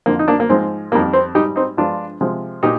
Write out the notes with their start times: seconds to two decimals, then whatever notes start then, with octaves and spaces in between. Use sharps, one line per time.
0.06 F2 D3 F3 A#3
0.19 D#4
0.28 A#3 D4
0.40 A#3
0.49 G#2 F3 G#3 C4
0.92 F2 D#3 G3 A#3
1.13 C4
1.35 G#2 G3 D#4 G4
1.56 C4 D#4
1.77 G2 F3 G#3 D4 F4
2.21 C3 F3 G#3
2.63 A#2 D#4 G4